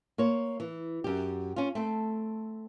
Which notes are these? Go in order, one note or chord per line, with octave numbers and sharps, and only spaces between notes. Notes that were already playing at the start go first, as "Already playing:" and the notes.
A#3 C5 C#5
E3
F#2 G4
C#4 F4
A3 C4